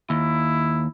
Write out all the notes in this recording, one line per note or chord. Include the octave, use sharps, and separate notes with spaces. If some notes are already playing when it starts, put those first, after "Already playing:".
D#2 E4